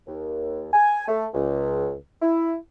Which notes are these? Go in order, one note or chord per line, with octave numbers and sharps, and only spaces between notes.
D#2
G#5
A3
C#2
E4